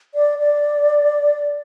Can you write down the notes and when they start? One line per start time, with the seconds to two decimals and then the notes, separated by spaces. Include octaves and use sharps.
0.14 D5
0.39 D5